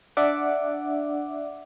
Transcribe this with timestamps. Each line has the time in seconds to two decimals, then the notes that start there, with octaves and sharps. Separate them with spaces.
0.17 D4 D5 E5 F#5 D6